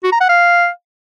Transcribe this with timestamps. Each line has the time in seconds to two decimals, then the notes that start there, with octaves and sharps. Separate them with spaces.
0.04 F#4
0.12 A#5
0.21 F#5
0.29 F5